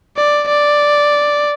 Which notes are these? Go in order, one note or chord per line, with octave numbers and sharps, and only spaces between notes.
D5
D5